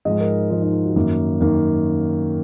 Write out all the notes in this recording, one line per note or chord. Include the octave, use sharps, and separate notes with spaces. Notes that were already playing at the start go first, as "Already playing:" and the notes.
G#2 F3 G#3 D#5
A#4
G#2 F3 G#3 F4
D#4
F4
F#4
F#2 D#3 A#3
F#2 D#3 A#3